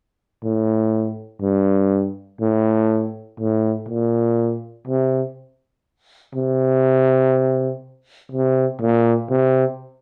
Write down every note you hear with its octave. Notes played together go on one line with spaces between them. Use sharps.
A2
G2
A2
A2
A#2
C3
C3
C3
A#2
C3